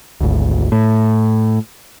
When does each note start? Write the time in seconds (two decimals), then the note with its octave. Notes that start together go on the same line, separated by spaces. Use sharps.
0.21 G#1 D2
0.72 A2